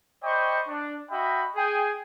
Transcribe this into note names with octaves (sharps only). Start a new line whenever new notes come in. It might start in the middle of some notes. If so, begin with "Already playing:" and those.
C5 D5 D#5 G5 B5 C#6
D4
F#4 D#5 E5 G5 B5
G#4 G5 G#5